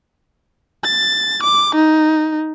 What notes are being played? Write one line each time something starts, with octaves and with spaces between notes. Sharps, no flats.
A6
D6
D#4